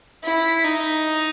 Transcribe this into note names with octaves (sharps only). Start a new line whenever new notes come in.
E4
D#4